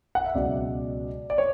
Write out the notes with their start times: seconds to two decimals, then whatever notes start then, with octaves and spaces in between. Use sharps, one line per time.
0.15 F#5
0.24 E5
0.34 C#2 B2 F#3 D5
1.30 D5
1.38 C#5